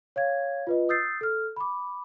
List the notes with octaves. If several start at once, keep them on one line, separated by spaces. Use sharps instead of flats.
C#5 F5 G#6
F4 B4 D#5
D#6 E6 G6 A6 C7
A4 F6
B5 D6